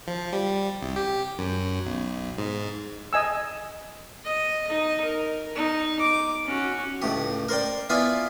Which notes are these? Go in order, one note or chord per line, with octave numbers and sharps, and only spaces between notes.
F3
G3
C2
G4
F#2
B1
G#2
D#5 G#5 E6
D#5
D#4 D#5
A#4
D#4
D6
C#4 F#4
C#2 A2 G4
A#4 C5 D5 G5
B3 E4 F4 D5 F5 G#5